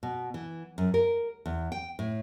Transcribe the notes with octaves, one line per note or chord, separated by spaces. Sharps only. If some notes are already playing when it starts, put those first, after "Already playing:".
B2
E3
F#2
A#4
E2
G5
A2